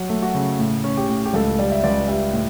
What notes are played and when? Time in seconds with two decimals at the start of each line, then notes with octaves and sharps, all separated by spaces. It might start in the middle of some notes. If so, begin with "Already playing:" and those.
Already playing: F#3
0.10 A3
0.22 F#4
0.34 C#3
0.59 A2
0.84 C#4
0.97 G4
1.09 A2
1.26 G4
1.34 C#2 A4
1.59 G3 D5
1.72 E5
1.84 C#2 D5
2.08 G3 E5
2.33 A2